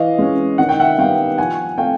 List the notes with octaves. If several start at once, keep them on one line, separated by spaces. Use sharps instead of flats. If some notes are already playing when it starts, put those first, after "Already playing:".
Already playing: E3 D#5 F5
G#3 C#4
D#3 F#5
G5
E5 F#5
G3 B3 F5 G5
F3 F#5 G#5
A3 C4 F5 G5